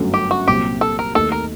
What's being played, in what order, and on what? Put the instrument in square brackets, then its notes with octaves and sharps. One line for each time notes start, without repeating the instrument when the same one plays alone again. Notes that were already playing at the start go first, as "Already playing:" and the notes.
Already playing: [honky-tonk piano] G1 F#2 F#3 A3
[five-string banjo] G4
F#4
[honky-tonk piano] C2 A#2 F#3 C4 [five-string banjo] G4
[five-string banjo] A4
A#4
[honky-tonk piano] D#2 D#3 A3 [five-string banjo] A4
[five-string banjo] A#4